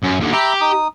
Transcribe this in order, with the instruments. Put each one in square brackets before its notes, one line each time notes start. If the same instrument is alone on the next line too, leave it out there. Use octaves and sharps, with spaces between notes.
[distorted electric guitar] F#2
D#2 D3
[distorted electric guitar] G4 [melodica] E5 A#5 B5
[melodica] D#4 D#6